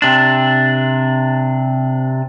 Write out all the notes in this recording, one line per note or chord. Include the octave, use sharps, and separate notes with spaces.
C3 D4